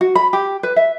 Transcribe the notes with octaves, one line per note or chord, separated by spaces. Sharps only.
F#4
B5
G4
B4
E5